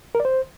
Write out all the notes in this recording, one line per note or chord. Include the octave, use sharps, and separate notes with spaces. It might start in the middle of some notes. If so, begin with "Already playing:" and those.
A#4
D5
C5